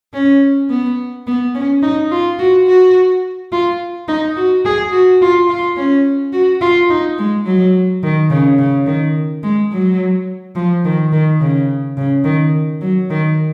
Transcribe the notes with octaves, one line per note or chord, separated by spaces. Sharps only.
C#4
B3
B3
C#4
D#4
F4
F#4
F#4
F4
D#4
F#4
G#4
F#4
F4
F4
C#4
F#4
F4
D#4
G#3
F#3
D#3
C#3
C#3
D#3
G#3
F#3
F3
D#3
D#3
C#3
C#3
D#3
F#3
D#3